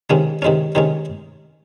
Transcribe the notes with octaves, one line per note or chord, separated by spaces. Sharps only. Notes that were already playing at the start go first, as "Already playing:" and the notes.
C3 D#3 G#3 C#4
C3 D#3 G#3 C#4
C3 D#3 G#3 C#4